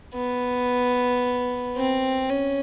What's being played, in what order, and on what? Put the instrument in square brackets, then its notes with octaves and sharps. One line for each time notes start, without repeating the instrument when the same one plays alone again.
[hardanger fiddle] B3
C4
C#4